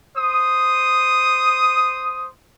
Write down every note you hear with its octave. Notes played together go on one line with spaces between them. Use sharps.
C5 D#6